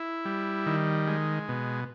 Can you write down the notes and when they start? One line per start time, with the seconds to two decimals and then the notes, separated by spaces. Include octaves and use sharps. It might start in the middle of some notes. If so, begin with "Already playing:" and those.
Already playing: E4
0.25 G3
0.66 D#3
1.08 G#3
1.48 B2